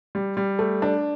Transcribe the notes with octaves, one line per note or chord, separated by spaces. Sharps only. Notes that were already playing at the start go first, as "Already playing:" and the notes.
G3
G3
A3
D4